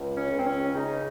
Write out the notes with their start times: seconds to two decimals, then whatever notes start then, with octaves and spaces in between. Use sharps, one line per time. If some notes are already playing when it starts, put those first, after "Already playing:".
Already playing: C#2
0.16 C#4
0.30 C#2
0.37 C4
0.45 C#4
0.75 C#3 D#4